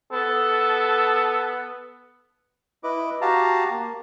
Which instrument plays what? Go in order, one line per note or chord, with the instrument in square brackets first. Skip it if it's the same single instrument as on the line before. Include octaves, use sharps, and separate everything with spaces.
[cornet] B3 [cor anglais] A4
[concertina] E4 B4 D#5 D6
F#4 G4 F5 A5 A#5
A#3